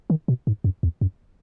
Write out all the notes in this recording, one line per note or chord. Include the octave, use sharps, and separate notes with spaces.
D#3
B2
G#2
F#2
E2
F#2